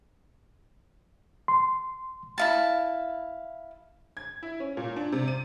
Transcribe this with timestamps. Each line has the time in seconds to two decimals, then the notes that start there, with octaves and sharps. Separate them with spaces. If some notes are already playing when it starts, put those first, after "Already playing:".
1.48 C6
2.38 E4 F5 A5
4.17 G#6
4.43 E4
4.60 C#4
4.77 A#2
4.96 D4
5.12 C3
5.28 D#7